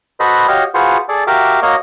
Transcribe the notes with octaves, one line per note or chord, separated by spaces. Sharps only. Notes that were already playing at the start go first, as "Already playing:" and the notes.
F#4 A4 B4 C5 D#5 B5
F#4 G4 C#5 D#5 F5
F4 F#4 G#4 B4 C5 F#5
G#4 A4 D5
F#4 G4 A#4 E5 F5 D6
A#3 F#4 C#5 D#5 F5 A#5